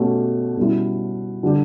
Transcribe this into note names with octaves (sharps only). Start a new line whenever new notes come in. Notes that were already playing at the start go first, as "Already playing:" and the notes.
Already playing: B2 A3 C#4 G4
B2 G3 C#4 E4
D3 G3 D4 G4